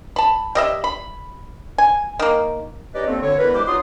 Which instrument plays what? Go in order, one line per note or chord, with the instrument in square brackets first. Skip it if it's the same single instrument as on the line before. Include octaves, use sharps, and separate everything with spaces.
[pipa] A5 B5
G3 D#5 E5
B5
G#5
D#3 A#3
[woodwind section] C#4 D#4 G4 B4 D5 D#5
D3 A3 A#3 C4
D2 D3 C#5
D3 E3 B3 A#4 B4
G2 E3 G#3 B4 C5 D6
G2 F#3 D#4 F4 C6 D#6